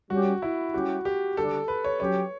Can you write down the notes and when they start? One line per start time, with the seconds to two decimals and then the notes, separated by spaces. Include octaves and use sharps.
0.10 G3 C#4 F#4 G4
0.42 E4
0.74 G3 C#4 E4 F#4 G4
1.05 G4
1.37 D3 G3 D4 A4
1.68 B4
1.84 C#5
2.00 F#3 C#4 G4 C#5